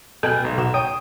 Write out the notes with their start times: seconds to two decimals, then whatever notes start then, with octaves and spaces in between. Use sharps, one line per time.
0.23 B2 A4 G5 G#5 F#6
0.44 B1
0.58 B2 F#4 E7
0.74 C#5 G5 D#6